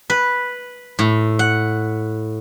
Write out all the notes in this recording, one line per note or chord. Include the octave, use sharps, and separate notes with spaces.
B4
A2
F#5